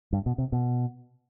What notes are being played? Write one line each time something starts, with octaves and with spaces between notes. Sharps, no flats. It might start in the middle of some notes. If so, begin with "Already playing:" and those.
G2
B2
C3
B2